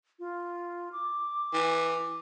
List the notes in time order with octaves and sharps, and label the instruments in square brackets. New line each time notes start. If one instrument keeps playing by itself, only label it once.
[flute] F4
D6
[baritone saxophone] E3